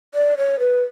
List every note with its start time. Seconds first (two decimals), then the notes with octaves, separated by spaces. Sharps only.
0.15 D5
0.37 C#5
0.59 B4